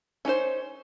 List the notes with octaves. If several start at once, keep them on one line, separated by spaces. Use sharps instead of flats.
C#4 D#4 F4 C5